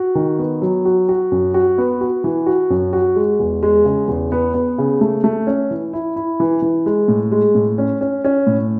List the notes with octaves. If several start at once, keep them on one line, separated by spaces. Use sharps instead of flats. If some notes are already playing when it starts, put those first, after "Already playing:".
Already playing: F#4
D#3
B3
F#3
F#4
F#4
F#2
F#4
B3
F#4
E3
F#4
F#2
F#4
G#3
E2
G#3
C#3
E2
B3
B3
C#3
A3
A3
C#4
E3
E4
E4
E3
E3
G#3
A2
G#3
A2
C#4
C#4
C#4
A2